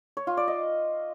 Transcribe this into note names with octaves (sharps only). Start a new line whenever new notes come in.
C#5
F4
D5
D#5